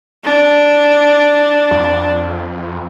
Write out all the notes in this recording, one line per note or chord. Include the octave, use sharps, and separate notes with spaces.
D4
F2